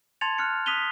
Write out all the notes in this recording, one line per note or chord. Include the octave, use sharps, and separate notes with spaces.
A5 C6 G#6 A6 C#7 F7
F6 F#6 C#7
D#6 F#6 B6 D#7 F7 G7